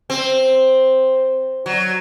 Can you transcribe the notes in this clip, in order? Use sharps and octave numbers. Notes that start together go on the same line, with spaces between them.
C4
F#3